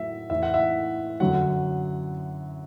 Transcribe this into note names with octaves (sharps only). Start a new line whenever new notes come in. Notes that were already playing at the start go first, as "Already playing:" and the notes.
Already playing: A2 F#3 E5
A2 E3 E5
F#5
E5
F#2 D3 F#3 F#5